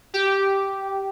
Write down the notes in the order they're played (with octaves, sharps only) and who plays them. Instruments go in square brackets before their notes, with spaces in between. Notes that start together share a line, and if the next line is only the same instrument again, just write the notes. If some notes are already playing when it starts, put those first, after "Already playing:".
[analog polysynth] G4